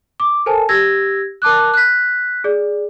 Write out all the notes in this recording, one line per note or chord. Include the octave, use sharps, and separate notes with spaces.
D6
A4 A#4 C5 G#5 A5
G4 E6 G#6 A#6
A#4 A5 D6 F#6
F#6 B6
G#4 D5